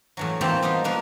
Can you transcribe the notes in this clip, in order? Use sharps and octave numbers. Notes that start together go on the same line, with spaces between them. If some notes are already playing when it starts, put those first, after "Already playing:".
A2 E3 F#3
E3 A3 A#3 C4 G4 A5
G3 B3 D#4 F4
F3 A#3 B4